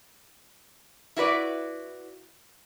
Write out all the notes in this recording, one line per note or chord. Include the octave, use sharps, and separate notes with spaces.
E4 F#4 B4 D5